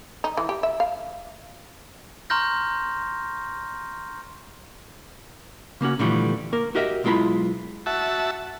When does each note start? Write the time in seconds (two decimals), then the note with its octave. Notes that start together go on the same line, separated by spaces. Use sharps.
0.24 D#4
0.37 E3
0.49 G4
0.63 E5
0.80 F5
2.30 A#5 C6 C#6 F6 G6 A#6
5.81 C#3 A#3 C#4 F#4
5.99 A#2 D3 E3 F3 G3 A3
6.53 A#3 A#4
6.75 F#4 G4 A#4 D#5 E5
7.04 B1 G#3 E4 F4 A#5 B5
7.86 F#4 E5 A5